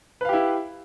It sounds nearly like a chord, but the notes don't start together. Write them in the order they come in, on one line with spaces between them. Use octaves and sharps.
B4 F5 G4 E4